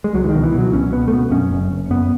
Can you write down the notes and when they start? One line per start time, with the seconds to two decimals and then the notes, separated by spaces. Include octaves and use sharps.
0.04 G#3
0.14 C#2 F#3
0.24 E3
0.29 D#3
0.34 B2
0.44 E3
0.54 B2 F#3
0.73 C#2 C#4
0.92 B2 B3
1.08 A3
1.13 B2 B3
1.31 F#2 C#4
1.51 F#1
1.72 F#1
1.90 F#2 B3